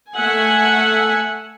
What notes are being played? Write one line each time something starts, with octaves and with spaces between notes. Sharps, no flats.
A3 E5 F#5 G#5